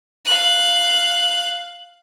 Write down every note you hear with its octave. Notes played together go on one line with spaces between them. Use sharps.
F5 F#6